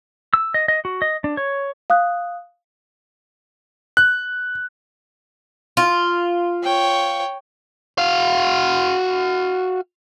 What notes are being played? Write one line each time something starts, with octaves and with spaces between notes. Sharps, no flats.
E6
D#5
D#5
F#4
D#5
D4
C#5
F5 D#6 F#6
F#6
F4
C#5 G5
F#4 F5